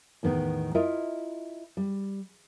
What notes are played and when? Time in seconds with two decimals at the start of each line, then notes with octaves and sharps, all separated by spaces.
0.23 E2 A2 D#3 B3
0.75 E4 F4 A#4 D#5 E5
1.77 G3